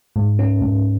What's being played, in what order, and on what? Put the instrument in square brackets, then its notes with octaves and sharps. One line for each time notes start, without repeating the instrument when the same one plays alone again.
[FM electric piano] G#2
C#4
G#2